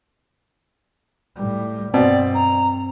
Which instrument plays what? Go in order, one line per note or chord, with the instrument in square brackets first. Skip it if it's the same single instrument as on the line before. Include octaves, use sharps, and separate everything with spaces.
[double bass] A2 G3
[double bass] G2 [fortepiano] B2 [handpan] C4 [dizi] D5
[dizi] A#5